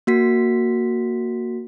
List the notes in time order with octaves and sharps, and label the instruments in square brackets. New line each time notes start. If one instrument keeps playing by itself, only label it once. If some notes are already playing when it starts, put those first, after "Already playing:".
[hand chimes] A#3 F#4 B6